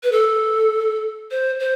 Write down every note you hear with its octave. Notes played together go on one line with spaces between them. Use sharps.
B4
A4
C5
C5